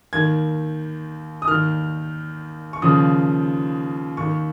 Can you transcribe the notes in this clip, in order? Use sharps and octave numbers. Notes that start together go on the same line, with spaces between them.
D#2 D#3 G#6
D#6
D#2 D#3 F6
C#6
D#2 C#3 F3 D#6
D#2 D#3 C#6